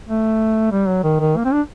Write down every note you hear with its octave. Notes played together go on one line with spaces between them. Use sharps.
A3
G3
F#3
D#3
D#3
A#3
C4
D4